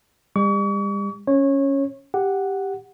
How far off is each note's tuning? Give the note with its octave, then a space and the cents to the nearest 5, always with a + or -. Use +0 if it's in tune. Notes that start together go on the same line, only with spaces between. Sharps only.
G3 +40 C#6 +40
C#4 +0 C#5 -20
G4 +0 F#5 +0